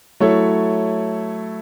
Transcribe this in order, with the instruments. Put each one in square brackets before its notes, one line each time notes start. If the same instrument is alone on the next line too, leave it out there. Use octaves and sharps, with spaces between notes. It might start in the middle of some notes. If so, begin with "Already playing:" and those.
[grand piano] F#3 A3 E4 A4 C#5